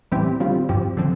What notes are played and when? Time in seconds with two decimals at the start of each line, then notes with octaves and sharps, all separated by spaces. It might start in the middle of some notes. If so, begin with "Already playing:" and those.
0.12 A2 E3 G3 C4 G4
0.40 D3 G3 C4 F4
0.69 G2 F3 C4 G4
0.97 D3 F3 C4